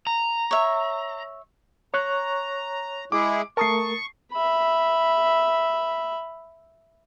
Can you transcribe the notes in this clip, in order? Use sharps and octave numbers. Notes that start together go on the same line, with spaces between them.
A#5
C#5 E5
C#5 A#5 C#6 F#6
G#3 E4 G#4 D6
A3 A#4 A5 C#6 D#6 C7
E5 B5